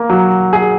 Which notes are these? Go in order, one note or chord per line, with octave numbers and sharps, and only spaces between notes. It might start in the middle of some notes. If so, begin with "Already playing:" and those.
Already playing: A#3
F#3
G#4